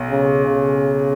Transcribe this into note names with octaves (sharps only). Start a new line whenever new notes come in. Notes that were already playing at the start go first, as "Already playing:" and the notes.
Already playing: B1
C#3
C#3